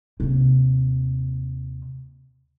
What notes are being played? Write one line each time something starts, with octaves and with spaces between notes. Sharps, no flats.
D#2 C3